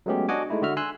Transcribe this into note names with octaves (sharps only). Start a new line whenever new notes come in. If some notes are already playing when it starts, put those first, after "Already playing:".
F#3 G#3 A3 B3 C#4 G4
D4 F#4 D#5 F#5 G#5 D6
G#3 A3 D#4 E4
D3 F#4 E5 F6
G#5 C6 E6 F#6